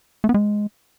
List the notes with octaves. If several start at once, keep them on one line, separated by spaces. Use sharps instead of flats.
A3
B3
G#3